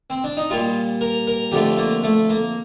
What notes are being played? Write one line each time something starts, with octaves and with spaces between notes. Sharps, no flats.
C4
D4
D#4
A#2 G3 F4
A#4
A#4
F2 D3 F3 A3 G4
A#3
A3
A#3